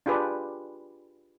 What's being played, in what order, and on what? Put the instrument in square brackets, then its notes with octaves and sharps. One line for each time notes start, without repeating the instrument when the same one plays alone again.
[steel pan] D4 F4 G4 G#4 B4 D5